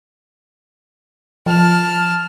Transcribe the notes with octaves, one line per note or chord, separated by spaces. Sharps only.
F3 A5 F6